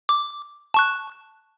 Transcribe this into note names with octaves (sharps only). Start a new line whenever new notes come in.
D6
A5 C#6 F#6